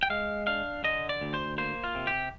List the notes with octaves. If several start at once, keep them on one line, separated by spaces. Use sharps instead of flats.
G5
G#3 F5
D4 F5
D3 D#5
D5
D2
C5
A#3 C5
F4
C3
G4